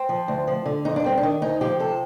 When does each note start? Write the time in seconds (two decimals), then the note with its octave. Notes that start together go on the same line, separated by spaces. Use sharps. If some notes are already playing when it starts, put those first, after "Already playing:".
Already playing: C4
0.09 F3
0.28 D2
0.47 F3
0.66 D3
0.85 F2 D#4
0.96 D4
1.04 G3 C4
1.17 D4
1.23 D#3
1.42 D2 D#4
1.61 F3 G4
1.80 C3 A4